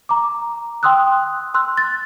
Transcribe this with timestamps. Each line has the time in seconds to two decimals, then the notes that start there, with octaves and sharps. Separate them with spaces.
0.09 A#5 D6
0.83 G5 C6 D#6 E6 F#6
1.54 C6 E6 F#6
1.77 A6